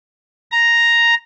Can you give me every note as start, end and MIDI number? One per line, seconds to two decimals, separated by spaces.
0.51 1.14 82